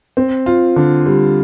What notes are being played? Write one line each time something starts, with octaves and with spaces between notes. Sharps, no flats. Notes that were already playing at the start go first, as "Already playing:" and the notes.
C4
F4
D3
G3